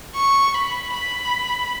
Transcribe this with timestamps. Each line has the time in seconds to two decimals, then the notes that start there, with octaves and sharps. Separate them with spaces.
0.15 C#6
0.54 B5
0.94 B5